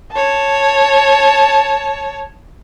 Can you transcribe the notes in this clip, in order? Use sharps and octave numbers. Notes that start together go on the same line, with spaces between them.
C#5 A5